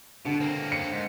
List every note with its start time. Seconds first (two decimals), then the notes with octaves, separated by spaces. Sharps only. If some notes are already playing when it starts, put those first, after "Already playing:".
0.25 B2 D3
0.40 A#3 C4
0.72 C#7
0.92 G#2